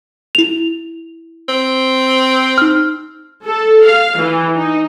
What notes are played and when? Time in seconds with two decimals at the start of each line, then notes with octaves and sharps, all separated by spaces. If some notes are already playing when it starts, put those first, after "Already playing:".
0.35 E4 F7
1.48 C4
2.58 D#4 F6
3.45 A4
3.83 F5
4.20 E3
4.57 D#4